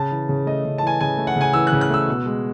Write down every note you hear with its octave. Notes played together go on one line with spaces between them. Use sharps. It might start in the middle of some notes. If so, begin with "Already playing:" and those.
Already playing: C#3 A5
E3
C#3
A3 D#5
C#3
A5
E3 G#5
C#3 G#5
A3
F#5
C#3 G#5
E3 E6
F#6
C#3
F#6
A3 E6
B2
G#3